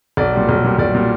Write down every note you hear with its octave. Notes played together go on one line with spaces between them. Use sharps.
B1 D5
A#2 G3
B1
A#2 G3
B1 D5
A#2 G3